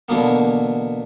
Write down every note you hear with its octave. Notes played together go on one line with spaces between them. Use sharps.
B2 D3 E3 F#3 A#3 B3